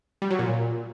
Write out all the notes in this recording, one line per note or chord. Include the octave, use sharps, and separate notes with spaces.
G3
F#3
A#2